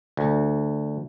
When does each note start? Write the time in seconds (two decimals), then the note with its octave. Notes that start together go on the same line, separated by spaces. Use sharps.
0.17 D2